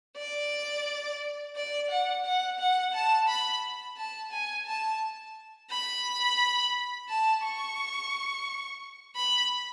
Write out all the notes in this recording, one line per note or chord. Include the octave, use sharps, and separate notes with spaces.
D5
D5
F#5
F#5
F#5
A5
B5
A5
G#5
A5
B5
A5
C#6
B5